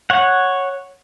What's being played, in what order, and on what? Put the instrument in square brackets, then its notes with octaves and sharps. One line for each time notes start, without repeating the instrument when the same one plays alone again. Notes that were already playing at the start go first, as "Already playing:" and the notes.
[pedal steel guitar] C#5 F#5